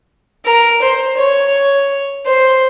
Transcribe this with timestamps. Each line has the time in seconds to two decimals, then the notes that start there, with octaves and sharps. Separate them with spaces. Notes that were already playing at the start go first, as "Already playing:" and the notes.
0.46 A#4
0.82 C5
1.18 C#5
2.26 C5